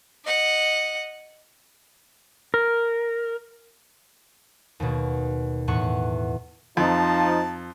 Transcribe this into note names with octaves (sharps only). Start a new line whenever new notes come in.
D#5 F#5
A#4
D#2 B2
E2 A2 F#5 C#6
F2 F3 D#4 A5